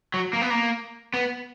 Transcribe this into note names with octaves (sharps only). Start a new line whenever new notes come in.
F#3
A#3
B3
A#3
B3